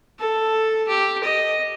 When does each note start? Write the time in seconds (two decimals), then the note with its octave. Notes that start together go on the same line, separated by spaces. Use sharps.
0.19 A4
0.87 G4
1.23 D#5